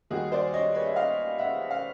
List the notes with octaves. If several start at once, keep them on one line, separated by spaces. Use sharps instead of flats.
D#2 D#3 G3 F#4 G#4
C5 D5
C#5 D#5
B4 C#5
E5
D#5 F5
E5 F#5
F5